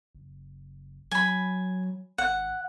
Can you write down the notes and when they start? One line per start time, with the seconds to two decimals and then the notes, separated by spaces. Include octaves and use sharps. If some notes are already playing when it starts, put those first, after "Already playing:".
0.15 F#1
1.11 F#3 G#5 B5
2.18 G#1 F#5